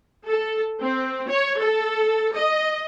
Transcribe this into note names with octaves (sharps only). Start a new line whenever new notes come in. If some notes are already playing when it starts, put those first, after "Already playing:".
A4
C4
C#5
A4
D#5